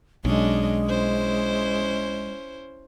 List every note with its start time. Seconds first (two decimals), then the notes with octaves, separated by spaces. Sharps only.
0.25 B1 G#3 C#4 D4 D#5
0.85 C#4 E4 C5